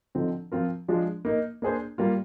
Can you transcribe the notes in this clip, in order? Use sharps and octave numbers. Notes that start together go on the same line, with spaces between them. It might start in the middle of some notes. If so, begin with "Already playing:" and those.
D3 F3 C4 D#4
F3 C4 F4 A#4
F3 G#3 D4 F4
A#3 D#4 A#4
A#3 D4 G#4 C5
G3 A#3 F4